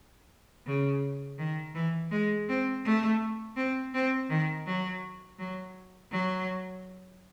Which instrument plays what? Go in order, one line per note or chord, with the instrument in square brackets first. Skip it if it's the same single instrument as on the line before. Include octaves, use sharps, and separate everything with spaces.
[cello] C#3
D#3
E3
G#3
C4
A3
C4
C4
D#3
F#3
F#3
F#3